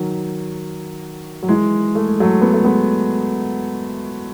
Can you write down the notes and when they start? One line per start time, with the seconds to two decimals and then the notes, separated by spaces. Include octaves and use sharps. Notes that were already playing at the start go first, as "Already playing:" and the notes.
Already playing: D#3 F#3
1.43 F#3
1.49 E3 G#3
1.95 A3
2.08 G#3
2.20 F#3 A3
2.41 B3
2.53 A3
2.64 G#3 B3